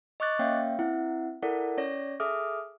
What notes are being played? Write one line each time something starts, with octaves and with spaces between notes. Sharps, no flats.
D#5 C#6 D6 F#6 A6
A#3 C#4 C#5 E5 F5 G5
C4 E4 E5 F#5
E4 A4 A#4 D5 F#5
C#4 C#5 D5 A#6
G#4 A4 E5 D6 D#6 F6